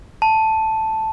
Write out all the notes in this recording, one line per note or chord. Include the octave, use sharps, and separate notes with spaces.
A5